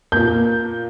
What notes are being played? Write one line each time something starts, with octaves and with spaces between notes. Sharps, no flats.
A#2 A#3 G6